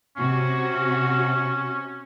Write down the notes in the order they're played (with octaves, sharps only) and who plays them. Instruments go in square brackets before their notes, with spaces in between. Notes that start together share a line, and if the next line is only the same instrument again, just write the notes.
[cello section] C3 F#4 [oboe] C#4